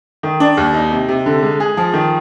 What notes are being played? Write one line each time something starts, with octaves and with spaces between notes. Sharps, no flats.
D#3
D4
D#2
D#4
C3
C3
D3
G#3
G#4
F3
D#3